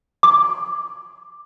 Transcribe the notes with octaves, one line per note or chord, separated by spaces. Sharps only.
D6